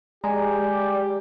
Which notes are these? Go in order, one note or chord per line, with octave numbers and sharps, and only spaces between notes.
G#3 G4 D5 G#5 A#5